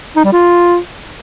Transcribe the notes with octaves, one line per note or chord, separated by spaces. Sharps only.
D#4
G3
F4